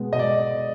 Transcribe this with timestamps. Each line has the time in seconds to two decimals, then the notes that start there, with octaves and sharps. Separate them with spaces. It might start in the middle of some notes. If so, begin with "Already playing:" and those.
Already playing: B2 G#3 B3
0.13 B2 D#5
0.19 D5